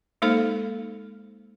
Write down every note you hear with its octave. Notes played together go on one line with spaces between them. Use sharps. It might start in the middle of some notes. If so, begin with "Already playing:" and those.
G#3 A#3 D#4 A4 C5 F5